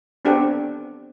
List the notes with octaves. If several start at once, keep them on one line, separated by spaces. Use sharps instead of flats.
B3 C4 D4 G4 A4 F#5